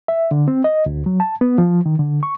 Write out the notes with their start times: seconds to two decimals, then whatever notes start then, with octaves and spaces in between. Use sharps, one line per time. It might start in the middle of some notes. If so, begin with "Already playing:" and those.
0.08 E5
0.31 D3
0.48 C4
0.64 D#5
0.86 D2
1.06 F#3
1.20 A5
1.41 B3
1.58 F3
1.86 D#3
1.99 D3
2.23 C#6